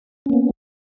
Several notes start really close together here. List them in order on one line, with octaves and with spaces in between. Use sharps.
C#4 A#3 B3